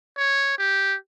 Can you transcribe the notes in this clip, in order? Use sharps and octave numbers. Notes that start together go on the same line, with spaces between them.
C#5
G4